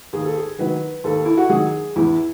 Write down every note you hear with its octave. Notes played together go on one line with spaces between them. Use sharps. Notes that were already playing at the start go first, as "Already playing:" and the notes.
D#2 G#4
A4
G#4
D#3 F#3 B4
D#2 A4
E4
F#4
D#3 F#3 G#4
E2 E4